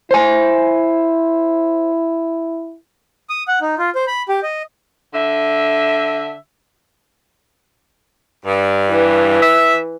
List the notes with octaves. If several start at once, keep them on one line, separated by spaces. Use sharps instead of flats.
E4 C5 G#5
D#6
F#5
D#4
F4
C5
B5
G4
D#5
D3 E5
G2
E3
E5